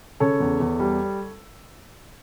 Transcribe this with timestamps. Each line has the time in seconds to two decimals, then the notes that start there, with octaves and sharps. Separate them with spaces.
0.20 C#3 A4 C#5
0.40 E2
0.60 E2
0.79 G3